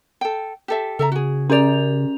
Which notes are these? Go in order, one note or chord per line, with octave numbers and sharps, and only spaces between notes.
A4 G5
G4 A4 E5
C#3 A4 E5 A#5
F#4 G#4
C#4 G#4 A#4 D5 F7